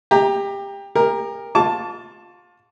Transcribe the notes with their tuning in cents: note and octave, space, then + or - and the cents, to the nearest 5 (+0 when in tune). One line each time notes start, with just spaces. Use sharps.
G4 +20 A#5 +0
G4 +40 A#4 +5
F4 +25 A5 +0 D6 -45